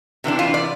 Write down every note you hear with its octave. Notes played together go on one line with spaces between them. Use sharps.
C3 E3 B3 D4
F4
D5